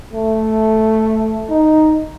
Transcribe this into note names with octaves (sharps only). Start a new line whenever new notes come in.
A3
D#4